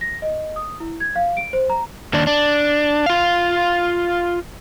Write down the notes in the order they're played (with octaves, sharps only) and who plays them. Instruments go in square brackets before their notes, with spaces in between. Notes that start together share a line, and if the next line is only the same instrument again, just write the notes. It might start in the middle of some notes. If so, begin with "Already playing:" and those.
[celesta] A#6
D#5
D#6
E4
G#6
F5
D7
C5
A#5
[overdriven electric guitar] D#2 D4
D4
F4 F5